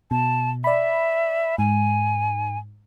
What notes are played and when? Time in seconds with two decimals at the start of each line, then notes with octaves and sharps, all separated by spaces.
0.11 B2 A5
0.64 D5 E5 B5
1.58 G#2 G#5